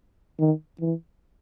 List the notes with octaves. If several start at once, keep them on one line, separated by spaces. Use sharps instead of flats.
D#3
E3